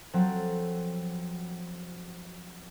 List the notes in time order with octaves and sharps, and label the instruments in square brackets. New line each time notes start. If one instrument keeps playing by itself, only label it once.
[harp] F3 F#3 C4 A4